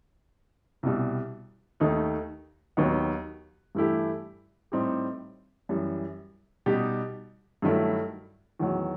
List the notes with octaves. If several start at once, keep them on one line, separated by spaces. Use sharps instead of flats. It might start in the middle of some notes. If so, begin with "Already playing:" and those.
C2 B2 G3
D#2 D#3 A3 D#4
D#2 D#3 F#3 B3 D#4
G2 E3 A3 E4 G4
A2 G3 C4 D#4 G4
F#2 E3 G3
B2 G3 D#4 G4
G2 D#3 F#3 A3 E4
E2 D#3 F#3 B3